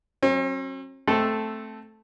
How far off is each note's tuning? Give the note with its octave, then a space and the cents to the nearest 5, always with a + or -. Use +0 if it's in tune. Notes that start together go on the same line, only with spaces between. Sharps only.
F#3 -10 C4 +45
A3 -5 C4 +0 A4 +0